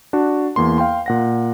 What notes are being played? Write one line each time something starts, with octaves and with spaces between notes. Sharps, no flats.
D4 F#4
E2 A#3 C6
F5 G5 C6
A#2 F#5 A#6